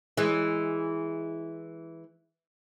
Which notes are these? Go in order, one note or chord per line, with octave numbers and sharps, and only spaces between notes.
E3 G#3